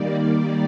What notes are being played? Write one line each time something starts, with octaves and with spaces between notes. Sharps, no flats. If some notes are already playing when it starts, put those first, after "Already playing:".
Already playing: D#3 G3 A#3 D5